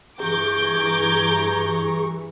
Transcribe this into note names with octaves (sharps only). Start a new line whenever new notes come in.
G2 E3 G#4 A#5 C#6 D6 G6 G#6